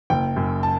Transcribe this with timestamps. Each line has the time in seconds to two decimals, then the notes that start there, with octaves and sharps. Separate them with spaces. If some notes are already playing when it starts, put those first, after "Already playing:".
0.10 F#1 G5
0.36 F#2
0.63 A5